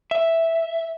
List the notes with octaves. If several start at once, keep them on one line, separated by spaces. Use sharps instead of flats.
E5